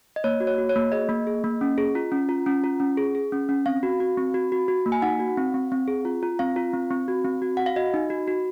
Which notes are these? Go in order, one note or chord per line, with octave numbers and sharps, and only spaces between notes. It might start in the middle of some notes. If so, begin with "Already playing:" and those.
D#5
A#3 C#5
F#4
C#5
F#4
C#5
A#3
G#4 D#5
A#3
G#4
A#3
C#4
G#4
F4
C#4
F4
C#4
F4
C#4
G#4
G#4
C#4
C#4
C4 F5
F#4
F#4
C4
F#4
F#4
F#4
A#3
G#5
D#4 F#5
F#4
C4
C4
C4
G#4
F4
F4
C4 F5
F4
C4
C4
F#4
C4
F#4
F#4 F#5
F5
F#4 D#5
D#4
F#4
F#4